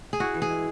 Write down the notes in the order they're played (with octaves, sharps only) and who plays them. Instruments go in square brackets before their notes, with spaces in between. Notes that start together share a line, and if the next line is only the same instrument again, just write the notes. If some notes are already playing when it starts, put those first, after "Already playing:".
[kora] G#4
[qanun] E4 [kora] F#4
[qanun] E3
[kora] G#4
[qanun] G#3